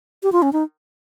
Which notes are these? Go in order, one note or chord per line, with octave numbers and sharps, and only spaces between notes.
G4
F4
C#4
D#4